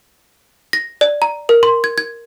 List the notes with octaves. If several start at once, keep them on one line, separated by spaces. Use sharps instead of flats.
A#6
D5
A#5
A#4
C6
G#6
G#6